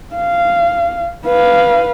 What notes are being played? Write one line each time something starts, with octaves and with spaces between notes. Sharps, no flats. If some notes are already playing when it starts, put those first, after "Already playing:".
F5
B4 F5